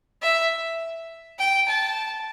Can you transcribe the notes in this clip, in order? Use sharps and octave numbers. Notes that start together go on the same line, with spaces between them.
E5
G5
A5